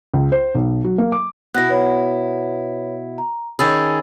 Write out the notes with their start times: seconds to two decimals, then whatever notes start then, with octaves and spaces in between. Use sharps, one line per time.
0.13 C#2
0.32 C5
0.55 B1
0.84 F#3
0.98 A#3
1.12 D6
1.54 B2 E4 F#6 A#6
1.69 B4 C#5 B5
3.18 A#5
3.59 D#3 C#4 G#4 B5 E6 A6